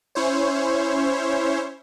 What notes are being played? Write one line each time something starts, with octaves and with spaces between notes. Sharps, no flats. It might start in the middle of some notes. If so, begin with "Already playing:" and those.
C#4 E4 C5 C#5